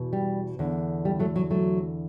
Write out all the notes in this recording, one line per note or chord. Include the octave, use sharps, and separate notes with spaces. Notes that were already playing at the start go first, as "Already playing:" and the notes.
Already playing: E2 B2
G3
E2 D3
G3
F#3 A3
F#3
F#3 A3